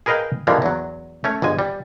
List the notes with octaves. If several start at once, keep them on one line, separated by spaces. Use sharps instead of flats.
G#4 A#4 B4 D#5 F5 G5
G#2 D3 E3 F3 G3 A#3
E2 F#3
A3 C#4 C#5
G1 G#2 G#3 G#5
G3